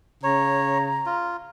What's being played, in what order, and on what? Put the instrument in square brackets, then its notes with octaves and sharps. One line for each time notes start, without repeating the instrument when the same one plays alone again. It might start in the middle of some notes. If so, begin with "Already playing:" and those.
[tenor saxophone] C#3 [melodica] C#5 [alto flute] A#5
[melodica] F4